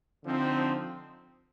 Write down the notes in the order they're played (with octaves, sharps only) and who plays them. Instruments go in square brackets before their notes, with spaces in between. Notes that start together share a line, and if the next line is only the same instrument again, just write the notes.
[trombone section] D3 F3 C4 D#4